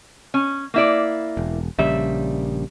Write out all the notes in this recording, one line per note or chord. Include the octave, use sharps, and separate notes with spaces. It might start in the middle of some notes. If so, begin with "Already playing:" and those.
C#4
A#3 E4 D5
E1
A#1 C#3 G3 E5